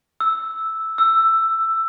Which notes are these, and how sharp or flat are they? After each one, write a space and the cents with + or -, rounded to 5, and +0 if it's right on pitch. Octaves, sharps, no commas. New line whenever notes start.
E6 -5
E6 +10